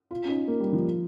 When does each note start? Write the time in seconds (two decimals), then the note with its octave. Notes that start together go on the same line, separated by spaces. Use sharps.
0.11 F4
0.25 C#4
0.29 D#4
0.48 A#3
0.60 G3
0.73 F3